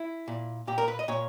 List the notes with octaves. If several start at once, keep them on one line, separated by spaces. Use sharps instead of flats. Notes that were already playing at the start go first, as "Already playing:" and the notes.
Already playing: E4
A#2
A#2 G4
A#4
B4
D#5
A#2 C#5